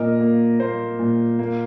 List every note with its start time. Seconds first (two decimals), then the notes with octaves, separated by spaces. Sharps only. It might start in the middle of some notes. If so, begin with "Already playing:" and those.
Already playing: A#2 A#4 D#5
0.20 A#3
0.59 A#3 C5
0.99 A#2
1.39 A#3